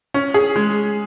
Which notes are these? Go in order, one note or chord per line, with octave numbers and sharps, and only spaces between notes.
C#4
G#4
G#3